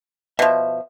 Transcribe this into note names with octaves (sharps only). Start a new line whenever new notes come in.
B2 F3 E5